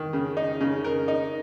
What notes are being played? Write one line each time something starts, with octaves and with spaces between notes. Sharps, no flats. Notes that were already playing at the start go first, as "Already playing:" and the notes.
Already playing: D#3
C#3
D#4
C#3
A#4
D#4